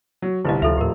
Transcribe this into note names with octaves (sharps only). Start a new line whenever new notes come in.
F#3
G1 C2 E4 B4 D#5
F1 D2 E4 F4 A4 E5 F7
D#2 A2 G4 A#4